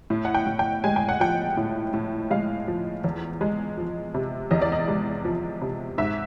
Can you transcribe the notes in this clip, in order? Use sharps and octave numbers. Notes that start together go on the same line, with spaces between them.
A2
F#5
G5
A2
G5
G#3 G#5
G5
F#5
F3 G5
A2
A2
G#3 F5
F3
E2
G#3
F3
C3
E2 D#5
D5
D#5
G#3
F3
C3
G#2 E5